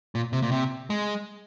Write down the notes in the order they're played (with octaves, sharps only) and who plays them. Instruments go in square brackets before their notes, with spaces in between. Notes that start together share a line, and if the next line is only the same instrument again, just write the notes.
[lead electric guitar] A#2
C3
A#2
C3
G#3